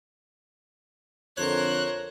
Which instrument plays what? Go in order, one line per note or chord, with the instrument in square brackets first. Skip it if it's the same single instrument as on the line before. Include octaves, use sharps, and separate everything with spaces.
[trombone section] F2 D3 [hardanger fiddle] A#4 C5 [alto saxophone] C#5 [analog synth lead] F#6